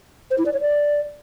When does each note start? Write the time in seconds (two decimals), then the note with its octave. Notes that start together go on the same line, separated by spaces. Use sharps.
0.31 C5
0.38 E4
0.46 D5
0.53 C#5
0.61 D5